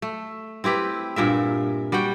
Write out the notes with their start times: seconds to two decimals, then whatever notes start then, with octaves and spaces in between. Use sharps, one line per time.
0.02 A3
0.64 C4 E4 G4 B4
1.16 G2 A#2 A#4 E5
1.92 G3 F#4 F#5 G5